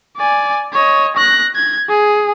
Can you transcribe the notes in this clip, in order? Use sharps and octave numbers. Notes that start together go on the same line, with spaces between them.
D5 G#5
C#5 D#5
F#6 A#6
G#6
G#4